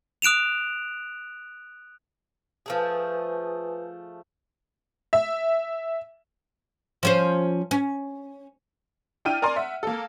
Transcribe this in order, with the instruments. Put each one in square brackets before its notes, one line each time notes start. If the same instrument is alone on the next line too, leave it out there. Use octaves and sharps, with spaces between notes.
[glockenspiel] D#6 F#6 D7 E7 F7
[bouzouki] F3 A3 G#4 [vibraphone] B4 G#5 D#6
[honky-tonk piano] E5
[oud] F3 C#4 C5
C#4
[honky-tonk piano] D4 E4 G5 F6 D#7
A#4 D5 G#5 A#5 C6
E5 F#5
A#3 A4